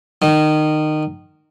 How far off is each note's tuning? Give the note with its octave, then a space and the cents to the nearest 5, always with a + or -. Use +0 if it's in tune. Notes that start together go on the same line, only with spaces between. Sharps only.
D#3 -20